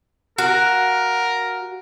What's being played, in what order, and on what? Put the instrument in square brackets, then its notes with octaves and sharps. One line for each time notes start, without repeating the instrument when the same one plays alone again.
[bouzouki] F#4 F5 [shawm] A#4